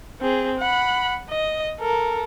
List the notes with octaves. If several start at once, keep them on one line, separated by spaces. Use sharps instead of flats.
C4 G#4
F#5 B5
D#5
A4 A#4